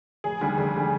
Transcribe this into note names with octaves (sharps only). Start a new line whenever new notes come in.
F1 G#4
D#2 D3 G3
F1 G#4
D3 G3